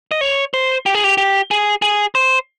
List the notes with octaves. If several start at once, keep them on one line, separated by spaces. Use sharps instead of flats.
D#5
C#5
C5
G4
G#4
G4
G4
G#4
G#4
C5